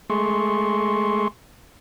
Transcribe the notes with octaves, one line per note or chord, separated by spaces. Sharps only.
G#3 A3 G#4 C6 C#6